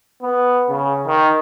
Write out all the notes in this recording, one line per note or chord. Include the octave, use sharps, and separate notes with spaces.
B3
C#3
D#3